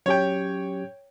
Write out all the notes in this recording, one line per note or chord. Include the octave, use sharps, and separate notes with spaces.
F#3 C#4 G4 C#5 G5